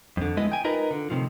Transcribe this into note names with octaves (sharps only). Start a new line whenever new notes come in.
F2 D3
G#3 B3 E4 D#5
G5 G#5
D#4 F4 A#4 B4 D#5
D3
A2 C3 D#3 F3